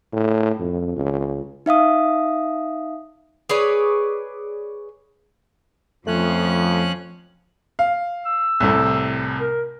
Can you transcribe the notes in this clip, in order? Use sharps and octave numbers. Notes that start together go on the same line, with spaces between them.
A2
F2
C#2
D#4 E5 F5 D#6
G#4 B4 C#5 D5
F2 F3 A3 C#4 F#6
F5
E6
C2 A2 C3
A#4